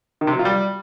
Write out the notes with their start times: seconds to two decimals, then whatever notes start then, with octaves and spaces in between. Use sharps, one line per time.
0.21 D#3
0.27 C3
0.33 F#3
0.39 F4
0.45 G3